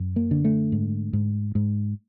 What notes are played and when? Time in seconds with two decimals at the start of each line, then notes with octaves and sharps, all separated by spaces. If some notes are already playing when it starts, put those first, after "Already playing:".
Already playing: F#2
0.16 A#3
0.31 D3
0.45 A3
0.72 G#2
1.13 G#2
1.55 G#2